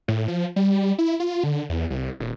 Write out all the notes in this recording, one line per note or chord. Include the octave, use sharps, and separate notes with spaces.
A2
F3
G3
E4
F4
D3
E2
C2
D#1